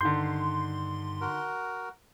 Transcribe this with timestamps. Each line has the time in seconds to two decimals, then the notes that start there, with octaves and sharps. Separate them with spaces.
0.01 G2 D3 D#3 C6 G6
1.21 F#4 A#4